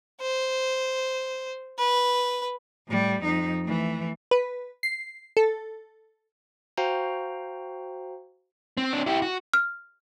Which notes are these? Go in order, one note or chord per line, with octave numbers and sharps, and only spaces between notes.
C5
B4
A2 G3
F2 D#4
E3 A3
B4
C7
A4
F#4 C5 F5 G5 A#5
C4
C4 D4
E4 G4
F#4
F6